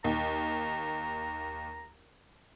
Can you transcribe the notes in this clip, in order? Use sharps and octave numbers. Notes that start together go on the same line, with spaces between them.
D#2 A#5